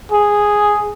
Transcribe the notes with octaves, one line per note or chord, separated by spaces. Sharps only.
G#4